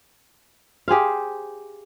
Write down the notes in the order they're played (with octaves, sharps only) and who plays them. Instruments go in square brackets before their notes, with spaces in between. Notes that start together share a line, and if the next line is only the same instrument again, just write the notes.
[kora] G4 G#4 C5 F5